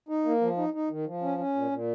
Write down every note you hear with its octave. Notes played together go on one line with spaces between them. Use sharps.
D#4
A#3
F3
D#4
D#4
D#3
F3
C#4
C#4
A#2
A#2